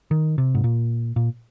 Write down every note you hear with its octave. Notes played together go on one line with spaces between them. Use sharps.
D#3
C3
G#2
A#2
A#2